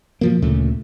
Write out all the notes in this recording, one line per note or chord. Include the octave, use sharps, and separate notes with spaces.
B2 F3 A#3
D2 A#2 C#3 A3